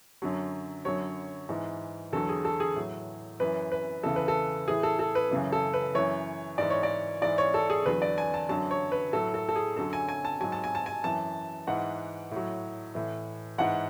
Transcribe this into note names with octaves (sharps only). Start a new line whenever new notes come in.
F#2 D3 F#3
F#2 D3 F#3 C#5
G#2 E3
E2 D3 F#3 A4
G#4
A4
G#4
A2 F#3
F#2 E3 B4
B4
E2 C#3 E3 A4
B4
A4
A2 E3 G#4
A4
A4
B4
F#2 C#3 E3
A4
B4
F#2 E3 C#5
G#2 E3 D5
C#5
D5
G#2 E3 D5
C#5
A4
G#4
E2 D3 F#3 B4
D5
G#5
A5
F#2 D3 F#3 A5
C#5
B4
A2 F#3 A4
A4
A4
G#4
F#2 D3 F#3 A4
G#5
G#5
A5
G#2 F#3 G#5
A5
G#5
A5
G#5
F#2 E3 A5
G#2 E3 F#5
A2 F#3
A2 E3
G#2 E3 F#5